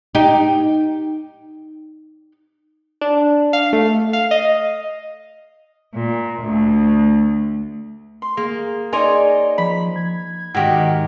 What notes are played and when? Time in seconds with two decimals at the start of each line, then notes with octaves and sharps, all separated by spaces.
0.15 D#4 G4
3.01 D4
3.53 F5
3.73 A3
4.13 F5
4.31 D#5
5.95 A#2
6.42 D2
8.22 C6
8.37 A#3 G#4
8.93 D#4 C#5 D5 G#5 A#5 C6
9.58 F3 B5
9.96 G#6
10.55 G#2 D#3 F#4 G4